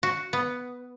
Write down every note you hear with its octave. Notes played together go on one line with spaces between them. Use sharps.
F#4
B3